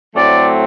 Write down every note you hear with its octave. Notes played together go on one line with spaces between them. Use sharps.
A2 F#3 A3 C4 D5